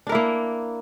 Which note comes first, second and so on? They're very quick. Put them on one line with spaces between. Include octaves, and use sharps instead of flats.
D4 A#4 E4 A#3